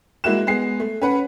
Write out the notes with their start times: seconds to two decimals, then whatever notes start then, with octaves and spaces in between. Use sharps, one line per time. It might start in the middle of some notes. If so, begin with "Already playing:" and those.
0.24 G#3 A#3 E4 F#4 F#6 E7
0.47 G#3 B3 G#4 C7
0.80 A3
1.02 C#4 B4 F#5